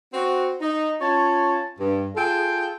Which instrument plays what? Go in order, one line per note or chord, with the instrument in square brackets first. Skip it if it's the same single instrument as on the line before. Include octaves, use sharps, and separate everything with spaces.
[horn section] C4 F#4
D#4
C#4 F4 C#5 A5
G2
F4 G#4 A4 G5